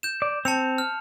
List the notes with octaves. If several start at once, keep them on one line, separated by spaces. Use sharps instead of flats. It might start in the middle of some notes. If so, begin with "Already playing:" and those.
G6 E7
D5
C4 A5 C#7 F7
F6